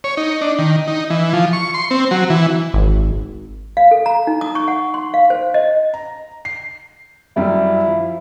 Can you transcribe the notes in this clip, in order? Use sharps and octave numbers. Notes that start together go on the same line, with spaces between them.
C#5
D#4
D4
D#3
D#4
E3
F3
C#6
C6
C4
F#3
E3
G#1
F5
A4
A#5
D#4
D#6
C#6
F#5
C6
F5
C5
D#5
A#5
C7
F#2 G3 E4
F3